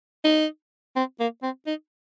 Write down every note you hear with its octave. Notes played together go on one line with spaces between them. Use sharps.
D#4
C4
A#3
C4
D#4